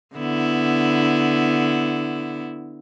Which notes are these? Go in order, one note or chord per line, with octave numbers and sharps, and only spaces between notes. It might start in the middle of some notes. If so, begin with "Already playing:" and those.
D3 B3 E4